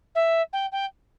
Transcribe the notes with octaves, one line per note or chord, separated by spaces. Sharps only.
E5
G5
G5